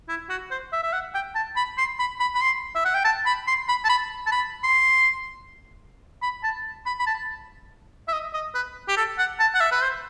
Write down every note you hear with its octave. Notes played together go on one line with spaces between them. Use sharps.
E4
F#4
C5
E5
E5
F#5
G5
A5
B5
C6
B5
B5
B5
C6
E5
F#5
G5
A5
B5
C6
B5
A5
B5
A5
B5
C6
B5
A5
B5
B5
A5
E5
D#5
D#5
B4
G4
A4
F#5
A5
F#5
E5
B4
C5